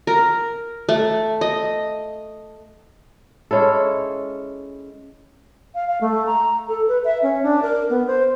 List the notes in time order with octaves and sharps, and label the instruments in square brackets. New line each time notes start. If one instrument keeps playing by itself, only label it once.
[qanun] A#4
A3
D#5
[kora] G#3 C#4 E4 A4
[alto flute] F5
F5
A3
A#5
A4
B4
E5
C#4
D4
A#4
B3
C5